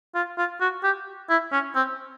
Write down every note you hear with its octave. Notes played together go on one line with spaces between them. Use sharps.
F4
F4
F#4
G4
E4
C#4
C4